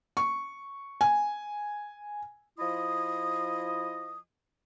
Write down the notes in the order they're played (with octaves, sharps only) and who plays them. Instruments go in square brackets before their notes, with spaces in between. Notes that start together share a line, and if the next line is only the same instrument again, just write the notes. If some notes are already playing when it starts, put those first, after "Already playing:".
[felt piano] C#6
G#5
[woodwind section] F3 E4 D#5 D#6